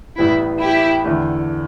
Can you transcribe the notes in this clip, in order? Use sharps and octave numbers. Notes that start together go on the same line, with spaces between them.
A1 A2 G3 B3 E4
E4 G4
E2 D3 A3